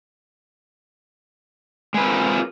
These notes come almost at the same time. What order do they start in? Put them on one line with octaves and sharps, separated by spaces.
G#3 B4 C4 A#4 F4